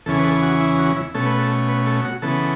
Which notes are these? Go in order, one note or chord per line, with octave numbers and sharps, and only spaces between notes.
E2 C#3 E3 C#4 A4
B4
A4
F#4
E4
F#4
E4
B2 A3 C#4 A4
B4
A4
B4
A4
F#4
C#3 E3 B3 A4